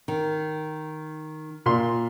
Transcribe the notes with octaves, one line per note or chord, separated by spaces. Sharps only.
D#3
A#2 C6